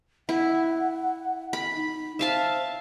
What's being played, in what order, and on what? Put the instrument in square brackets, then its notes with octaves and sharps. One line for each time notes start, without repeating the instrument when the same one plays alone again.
[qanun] E4 [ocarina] F#5
[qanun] B5
[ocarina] D#4
[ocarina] C5 [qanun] E5 F5 A5